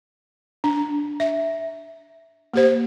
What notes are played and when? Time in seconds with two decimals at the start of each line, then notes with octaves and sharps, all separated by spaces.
0.64 D4
1.20 E5
2.54 A#3 G4 C5